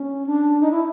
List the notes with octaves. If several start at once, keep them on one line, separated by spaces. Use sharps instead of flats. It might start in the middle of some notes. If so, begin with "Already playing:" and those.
Already playing: C#4
D4
D#4
E4